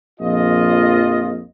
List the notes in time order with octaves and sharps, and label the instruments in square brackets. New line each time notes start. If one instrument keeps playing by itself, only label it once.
[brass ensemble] A#1 F2 F4 D#5